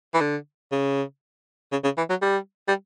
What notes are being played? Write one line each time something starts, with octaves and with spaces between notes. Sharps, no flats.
E3
D3
C#3
C#3
C#3
E3
F#3
G3
G3